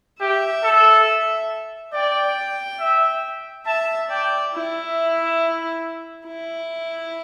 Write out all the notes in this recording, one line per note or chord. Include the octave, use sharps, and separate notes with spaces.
G4 E5
A4
D5 G5
E5
E5 A5
D5 G5
E4 E5
E4